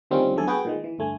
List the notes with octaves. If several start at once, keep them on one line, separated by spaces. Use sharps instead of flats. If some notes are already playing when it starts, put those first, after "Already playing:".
D2 D#3 G3 C4 C#4 F4
E2 D3 F#3 A3 A4 G#5
B3 F#4 G#4 B4 G5
A#2 D#3 G#3
E3
G1 D2 A3 G#5